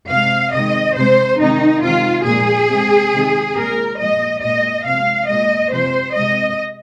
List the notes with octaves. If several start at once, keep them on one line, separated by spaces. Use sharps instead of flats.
C3 G#3 F5
C3 D#3 G#3 D#5
C3 G#3 C5
C3 D#3 G#3 D#4
C3 D#3 G#3 F4
A#2 F3 G#3 G#4
C3 G#3
C3 D#3 G#3
A#2 G#3 A#4
A#2 F3 G#3 D#5
A#2 G#3 D#5
C3 F3 G#3 F5
A#2 G#3 D#5
C3 F3 G#3 C5
C3 G#3 D#5